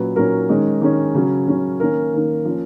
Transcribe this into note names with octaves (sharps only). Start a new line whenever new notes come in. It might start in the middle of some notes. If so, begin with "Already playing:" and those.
Already playing: A#2 F#3 C#4 B4
A#2 F#3 C#4 A#4
D#3 G#3 C#4
D#3 G#3 C#4
C#3 F#3 C#4
C#3 F#3 C#4
D#3 A#3 C#4 A#4
D#3 A#3 C#4
F3 A#3 C#4